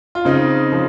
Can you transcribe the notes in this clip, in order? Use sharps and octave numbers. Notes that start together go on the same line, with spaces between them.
F4
C#3 C4 D#4
F3